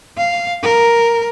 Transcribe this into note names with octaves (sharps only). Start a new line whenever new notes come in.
F5
A#4